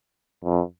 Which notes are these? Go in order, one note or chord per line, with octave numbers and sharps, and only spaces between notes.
F2